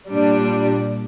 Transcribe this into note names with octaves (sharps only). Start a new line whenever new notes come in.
A#2 G3 D4